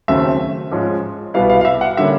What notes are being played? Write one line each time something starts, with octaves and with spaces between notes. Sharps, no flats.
D#2 C#3 F#3 A3 C4 E5
G#2 F3 G#3 C#4
C2 B2 G3 B3 E4 F5
F5
F5
E5
F#5
D3 G3 A#3 C#4 E5